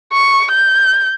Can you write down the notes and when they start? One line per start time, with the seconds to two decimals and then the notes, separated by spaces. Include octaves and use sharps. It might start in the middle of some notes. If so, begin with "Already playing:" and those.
0.13 C#6
0.51 G6